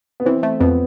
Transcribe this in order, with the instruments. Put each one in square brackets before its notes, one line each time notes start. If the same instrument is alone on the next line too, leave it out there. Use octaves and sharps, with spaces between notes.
[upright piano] B3
[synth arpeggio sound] E3 [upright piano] C4
[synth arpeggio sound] A3
[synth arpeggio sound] F2 [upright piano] B3